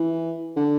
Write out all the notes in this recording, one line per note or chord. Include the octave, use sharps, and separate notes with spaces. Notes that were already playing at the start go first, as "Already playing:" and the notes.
Already playing: E3
D3